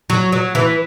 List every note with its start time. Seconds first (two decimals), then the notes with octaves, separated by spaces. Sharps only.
0.10 F#3
0.32 F#3
0.55 E3